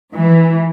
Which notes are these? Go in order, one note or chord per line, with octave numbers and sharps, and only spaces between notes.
E3